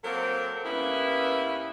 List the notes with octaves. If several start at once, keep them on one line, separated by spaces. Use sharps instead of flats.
F#3 A#3 C4 A4 A#4
G2 A#3 B3 C#4 E4